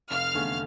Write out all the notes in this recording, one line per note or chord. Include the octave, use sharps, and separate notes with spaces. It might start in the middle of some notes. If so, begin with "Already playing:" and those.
F1 F5 F6
E2 D3 A3 C#4